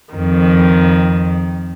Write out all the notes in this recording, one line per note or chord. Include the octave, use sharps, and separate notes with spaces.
F2 D#3